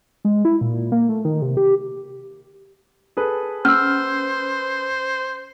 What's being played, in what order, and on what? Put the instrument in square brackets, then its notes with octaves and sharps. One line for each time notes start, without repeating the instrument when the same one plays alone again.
[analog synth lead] G#3
E4
A#2
A#3
A3
D#3
C3
G4
[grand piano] G#4 A4 B4
[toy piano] C#4 [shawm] C5 [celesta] E6 F6